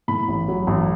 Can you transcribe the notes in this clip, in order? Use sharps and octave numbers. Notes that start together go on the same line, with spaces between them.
A2 B5
A1
F#3
A1